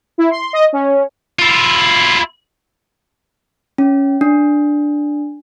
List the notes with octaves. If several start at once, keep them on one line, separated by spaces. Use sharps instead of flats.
E4
C6
D#5
C#4
E4 F4
C#4
D4